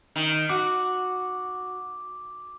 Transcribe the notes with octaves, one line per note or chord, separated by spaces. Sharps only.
D#3
F#4 D6